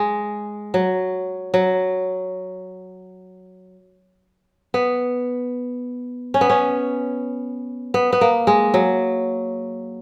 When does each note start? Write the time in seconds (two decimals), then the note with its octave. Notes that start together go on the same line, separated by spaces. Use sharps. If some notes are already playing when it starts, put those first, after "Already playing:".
Already playing: G#3
0.74 F#3
1.54 F#3
4.74 B3
6.34 C#4
6.41 B3
6.50 C#4
7.94 B3
8.13 B3
8.21 A#3
8.47 G#3
8.74 F#3